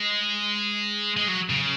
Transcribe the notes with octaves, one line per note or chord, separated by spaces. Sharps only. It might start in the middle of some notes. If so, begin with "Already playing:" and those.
Already playing: G#3
G#3
F#3
C#3